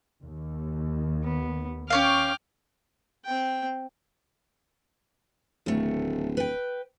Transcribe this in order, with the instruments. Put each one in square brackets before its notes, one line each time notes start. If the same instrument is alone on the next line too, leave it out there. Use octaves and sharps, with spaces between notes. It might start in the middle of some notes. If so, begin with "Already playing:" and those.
[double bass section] D#2
[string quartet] B3
[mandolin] C#4 C#5 F5 [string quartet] G5 D6 F6
[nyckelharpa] C4 G5
[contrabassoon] D1 [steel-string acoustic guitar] D#2 A3
[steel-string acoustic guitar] B4 G5